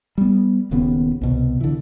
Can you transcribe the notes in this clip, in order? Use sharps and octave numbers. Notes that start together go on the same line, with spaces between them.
G3 B3
D#1 D#2 C#3 B3
C2 B2
D3 E3